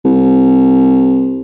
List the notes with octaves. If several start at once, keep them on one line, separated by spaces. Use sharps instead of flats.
C2